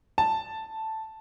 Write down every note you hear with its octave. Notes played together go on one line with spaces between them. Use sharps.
A5